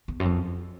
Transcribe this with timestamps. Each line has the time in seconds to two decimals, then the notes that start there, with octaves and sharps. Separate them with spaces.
0.08 E2
0.20 F#2
0.25 F2